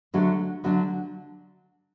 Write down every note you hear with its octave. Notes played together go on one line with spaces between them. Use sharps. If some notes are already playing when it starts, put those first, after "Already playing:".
D3 F#3 A3 D4
D3 F#3 A3 D4